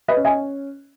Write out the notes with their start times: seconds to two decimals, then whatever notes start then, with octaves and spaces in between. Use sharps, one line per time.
0.08 B4 D#5
0.17 C#4
0.25 D#5 G#5